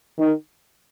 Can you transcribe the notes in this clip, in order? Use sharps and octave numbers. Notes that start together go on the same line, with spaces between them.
D#3